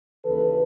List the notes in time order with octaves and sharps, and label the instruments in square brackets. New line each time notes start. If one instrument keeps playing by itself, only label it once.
[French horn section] D#2 C#3 E3 A4 B4